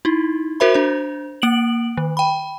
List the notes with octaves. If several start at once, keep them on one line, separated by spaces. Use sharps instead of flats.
D#4 E4
F#4 A#4 C5 E5 B5
D4 C5
A#3 D7 F#7
D#3
G5 B5